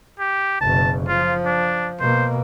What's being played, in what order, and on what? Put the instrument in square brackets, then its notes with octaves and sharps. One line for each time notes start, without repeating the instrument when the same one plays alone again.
[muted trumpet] G4
[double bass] F#1 B2 [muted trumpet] A5
[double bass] F3 [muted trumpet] F4
[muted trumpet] D4
[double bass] B2 A#3 [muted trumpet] C5